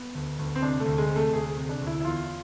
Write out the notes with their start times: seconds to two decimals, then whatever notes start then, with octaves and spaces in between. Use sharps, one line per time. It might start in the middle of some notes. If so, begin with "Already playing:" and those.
Already playing: B3
0.15 D2
0.39 D2
0.55 C4
0.62 C3 D4
0.80 A3
0.86 D2
0.98 G#3
1.09 C3
1.16 A3
1.33 D2 G#4
1.57 C3
1.69 D4
1.81 D2
1.87 E4
2.00 E4
2.05 E2 F4